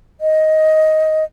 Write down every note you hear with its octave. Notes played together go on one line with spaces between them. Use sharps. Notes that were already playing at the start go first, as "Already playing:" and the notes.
D#5